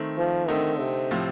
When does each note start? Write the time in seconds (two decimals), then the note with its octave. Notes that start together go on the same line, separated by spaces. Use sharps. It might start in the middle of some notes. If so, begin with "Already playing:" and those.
Already playing: D#3 A3 C4
0.18 F3
0.48 D3 D#3 A3 C4 D#4
0.80 C3
1.11 A2 F3 C4 F4